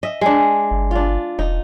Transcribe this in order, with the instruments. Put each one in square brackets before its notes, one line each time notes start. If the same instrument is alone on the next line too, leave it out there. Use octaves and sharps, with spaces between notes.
[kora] D#5 E5
G#3 D4
[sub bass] G1
[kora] D4 F4
[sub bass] E1 [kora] D#4